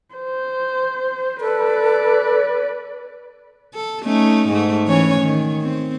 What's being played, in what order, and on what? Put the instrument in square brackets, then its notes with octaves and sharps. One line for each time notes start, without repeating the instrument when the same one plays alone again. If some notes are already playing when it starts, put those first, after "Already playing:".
[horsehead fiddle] C5
[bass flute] A4 [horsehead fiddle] B4 D5
[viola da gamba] A4
A3 C#4 D#4
G#2 A3
E3 C#4 C#5
D#3
C4